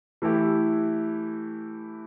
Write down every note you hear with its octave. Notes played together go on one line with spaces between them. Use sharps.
E3 A3 E4 G4